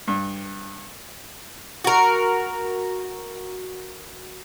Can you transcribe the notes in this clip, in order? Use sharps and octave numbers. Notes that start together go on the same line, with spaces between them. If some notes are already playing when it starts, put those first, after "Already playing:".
G2
F#4 A#4